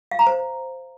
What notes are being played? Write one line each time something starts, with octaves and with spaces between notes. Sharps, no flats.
F5
A#5
C5